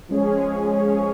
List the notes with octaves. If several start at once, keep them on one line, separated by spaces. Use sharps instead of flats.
F3 G#3 C#4 G#4 C#5
F3 G#3 C#4 G#4 C#5